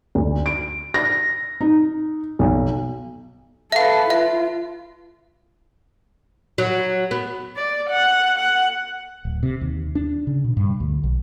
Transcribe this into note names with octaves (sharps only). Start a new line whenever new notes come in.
D2
D7
A#6
D#4
B1
A4 B4 E5 F5
F4 E5
F#3
B3
D5
F#5
F#5
D1
C3
D#2
D4
C#3
B2
G2
D2
B1